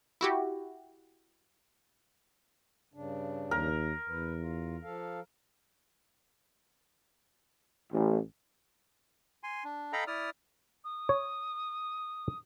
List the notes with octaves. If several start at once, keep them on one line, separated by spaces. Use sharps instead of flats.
E4 F#4 G4
G2 C#3 D4
D#2 A#4
E2 B4
F4
F3 A4 F5
A1
G#5 C6
D4
A4 D#5 F5 G5 A#5 B5
E4 D5 D#6 F6
D#6
C#5